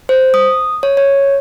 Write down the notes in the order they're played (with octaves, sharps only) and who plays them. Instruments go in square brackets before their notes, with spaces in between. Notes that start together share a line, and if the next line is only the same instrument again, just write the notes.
[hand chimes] C5
D#6
C#5
C#5